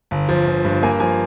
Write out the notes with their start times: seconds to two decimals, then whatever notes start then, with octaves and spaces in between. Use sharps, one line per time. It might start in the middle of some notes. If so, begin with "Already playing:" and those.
0.11 G1
0.29 F3
0.47 G1
0.65 G2
0.83 A#3 G#5
1.00 F3 G#5